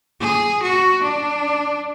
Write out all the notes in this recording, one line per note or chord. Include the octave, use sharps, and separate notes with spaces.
G#4
F#4
D4